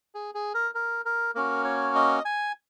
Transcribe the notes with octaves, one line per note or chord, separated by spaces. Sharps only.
G#4
G#4
A#4
A#4
A#4
A#3 C#4 F#4 A#4
C#5
D#5
G#5